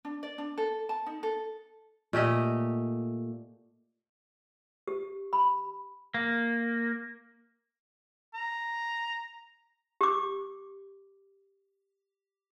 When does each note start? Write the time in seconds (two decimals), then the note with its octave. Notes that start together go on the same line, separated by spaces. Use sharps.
0.05 D4
0.23 D5
0.38 D4
0.58 A4
0.89 A5
1.06 D#4
1.23 A4
2.13 A#2 A3 G4 D#5
4.88 G4
5.33 B5
6.14 A#3
8.34 A#5
10.01 G4 D6